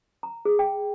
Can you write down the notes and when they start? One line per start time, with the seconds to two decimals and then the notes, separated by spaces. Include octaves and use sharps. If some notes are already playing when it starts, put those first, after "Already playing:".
0.23 A#5
0.45 G#4
0.59 G5